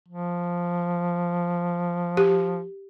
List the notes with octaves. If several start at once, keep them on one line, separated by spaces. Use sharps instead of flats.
F3
G4